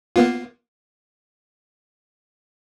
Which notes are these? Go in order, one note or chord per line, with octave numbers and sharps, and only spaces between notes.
A#3 B3 F4